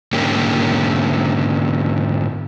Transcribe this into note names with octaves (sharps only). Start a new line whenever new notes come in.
G#2 D3 A#3 C#4 G4